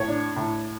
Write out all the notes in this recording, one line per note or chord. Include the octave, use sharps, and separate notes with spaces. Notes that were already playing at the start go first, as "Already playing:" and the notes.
Already playing: A2 C#5
D4
A2